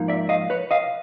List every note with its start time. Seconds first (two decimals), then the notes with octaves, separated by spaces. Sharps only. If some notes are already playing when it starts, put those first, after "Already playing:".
Already playing: G#2 F3 A#3 D#4
0.08 D5 E5
0.29 D#5 F5
0.50 B4 C#5
0.71 D#5 F5